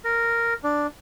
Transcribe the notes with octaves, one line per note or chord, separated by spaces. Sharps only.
A#4
D4